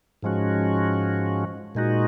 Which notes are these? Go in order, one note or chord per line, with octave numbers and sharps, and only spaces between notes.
G#2 F3 G#3 C#4 F#4
A#2 G#3 D#4 F#4